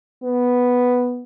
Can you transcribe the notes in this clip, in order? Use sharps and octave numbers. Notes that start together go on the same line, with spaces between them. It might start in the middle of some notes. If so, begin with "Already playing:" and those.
B3